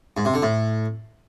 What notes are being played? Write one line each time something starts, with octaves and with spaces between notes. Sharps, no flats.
G#2
C3
D3
A2